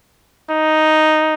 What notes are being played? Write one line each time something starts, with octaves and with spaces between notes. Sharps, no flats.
D#4